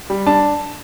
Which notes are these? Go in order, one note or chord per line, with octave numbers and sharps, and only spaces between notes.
G3
D4 A5